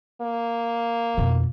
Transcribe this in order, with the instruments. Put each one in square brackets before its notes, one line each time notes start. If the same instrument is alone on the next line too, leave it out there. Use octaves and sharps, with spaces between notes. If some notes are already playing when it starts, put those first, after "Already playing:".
[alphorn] A#3
[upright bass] F2 B2